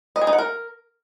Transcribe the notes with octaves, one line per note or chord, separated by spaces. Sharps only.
D#5
G#4
D#4
F#5
A#4